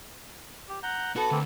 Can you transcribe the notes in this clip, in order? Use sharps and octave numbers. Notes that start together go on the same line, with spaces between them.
G4
F#5 A#5 G6
B3 F#4 A4
D2 A#3 C4